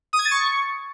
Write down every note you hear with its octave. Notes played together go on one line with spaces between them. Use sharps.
D#6
G#6
A6
C#6